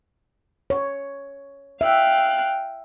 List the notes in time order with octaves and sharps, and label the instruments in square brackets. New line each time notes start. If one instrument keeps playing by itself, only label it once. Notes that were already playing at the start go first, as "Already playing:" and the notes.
[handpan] C#5
[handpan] E5 [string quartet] F5 G5 F#6